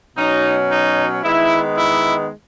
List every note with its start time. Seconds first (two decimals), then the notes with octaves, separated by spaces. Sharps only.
0.16 B2 F#3 C#4 D#4
0.70 D#4
1.23 D#3 G#3 B3 E4
1.77 E4